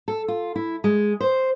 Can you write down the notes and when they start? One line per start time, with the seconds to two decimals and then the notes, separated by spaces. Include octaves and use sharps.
0.08 A4
0.28 F4
0.56 E4
0.84 G#3
1.21 C5